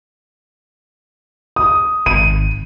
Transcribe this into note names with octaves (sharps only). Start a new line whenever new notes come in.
D#6
G#1 D#7